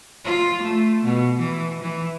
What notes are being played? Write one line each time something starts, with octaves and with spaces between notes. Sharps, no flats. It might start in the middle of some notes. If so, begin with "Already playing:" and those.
F4
A3
B2
E3
E3